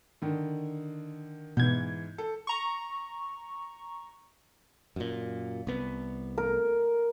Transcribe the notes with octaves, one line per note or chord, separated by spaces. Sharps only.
D3 D#3
G#2 B2 E3 G6 G#6
A4
A#5 C#6
F#2 A#2
C2 B3
A#4